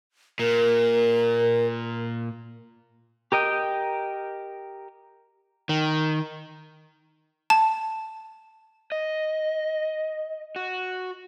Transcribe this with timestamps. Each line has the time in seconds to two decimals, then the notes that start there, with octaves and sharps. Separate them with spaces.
0.39 A#2 A#4
3.32 G4 A#4 D#5 G5
5.69 D#3
7.50 A5
8.92 D#5
10.56 F#4